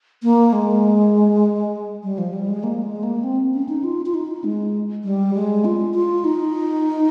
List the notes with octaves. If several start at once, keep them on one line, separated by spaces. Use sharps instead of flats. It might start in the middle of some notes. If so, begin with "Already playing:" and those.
A#3
G#3
G3
F3
G3
G#3
A#3
G#3
A#3
C4
C#4
D#4
F4
F4
D#4
G#3
G3
G#3
F4
F4
D#4